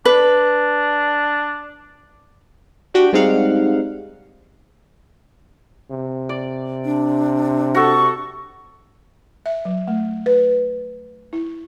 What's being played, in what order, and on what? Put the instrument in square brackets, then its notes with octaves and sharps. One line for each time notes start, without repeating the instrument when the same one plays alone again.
[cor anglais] D4 [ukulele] B4
[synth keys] D4 F#4 G4 G5
G3 G#3 C4 D#4 F5 F#5
[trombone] C3
[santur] D5
[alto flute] D4
[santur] F#4 A4 [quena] C#6
[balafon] E5
F#3
A3
B4
E4